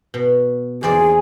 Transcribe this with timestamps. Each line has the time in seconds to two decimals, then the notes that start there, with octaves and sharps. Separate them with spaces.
0.14 B2
0.83 E2 G#4 C5 D5